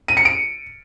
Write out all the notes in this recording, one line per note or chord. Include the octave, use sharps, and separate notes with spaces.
D#7
C#7
D7